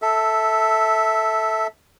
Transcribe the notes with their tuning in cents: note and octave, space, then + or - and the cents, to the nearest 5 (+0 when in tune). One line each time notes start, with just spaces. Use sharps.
A4 +0 E5 -10